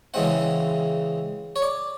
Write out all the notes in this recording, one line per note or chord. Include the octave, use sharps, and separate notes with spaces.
C#3 E3 G#3 C4 F#5
C#5
D5